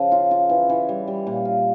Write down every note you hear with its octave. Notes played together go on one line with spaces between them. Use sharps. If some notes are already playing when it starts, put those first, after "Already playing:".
Already playing: C#3 F3
F4
F4
E3
E3
G3
G3
A#2
F4